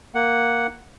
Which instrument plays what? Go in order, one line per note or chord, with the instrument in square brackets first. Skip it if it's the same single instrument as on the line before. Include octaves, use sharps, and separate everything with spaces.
[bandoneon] A#3 F#5